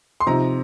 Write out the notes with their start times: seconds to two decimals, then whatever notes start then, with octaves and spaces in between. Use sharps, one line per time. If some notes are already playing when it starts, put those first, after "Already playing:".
0.20 C6
0.27 C3 F3 C4 D#4 A#5